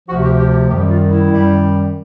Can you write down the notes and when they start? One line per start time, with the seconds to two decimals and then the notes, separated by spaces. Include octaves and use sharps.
0.09 D2 C3 F3 F#4
0.24 G4
0.39 G4
0.54 G4
0.69 F#2 D#3 G3 G4
0.90 F4
1.10 E4
1.30 F#2 D#3 G3